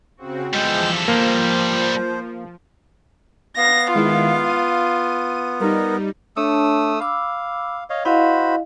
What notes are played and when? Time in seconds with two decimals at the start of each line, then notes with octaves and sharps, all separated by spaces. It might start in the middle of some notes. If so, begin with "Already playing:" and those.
0.17 C#3 C4 F#4
0.54 E2 F3 G3 G#3 A4 G5 E7
1.08 F3 A#3 C5
3.57 B3 F5 A#6
3.94 D#3 G#3 E4 F4
4.43 D#7
5.60 G3 D#4 A#4
6.37 A3 D4 C#5 A5 D#6 E6
7.00 F5 B5 D6 E6
7.90 C#5 D#5 F5
8.05 E4 F#4 C5 D#5 F5 B5